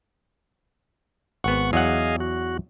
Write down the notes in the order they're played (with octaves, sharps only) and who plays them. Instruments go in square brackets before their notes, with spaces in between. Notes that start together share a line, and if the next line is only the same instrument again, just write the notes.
[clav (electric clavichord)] G#1 B3 [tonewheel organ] F#5 C#6
[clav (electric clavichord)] E2 F#3 F#5 [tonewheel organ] G#4 D#5 F5
[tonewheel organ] F#4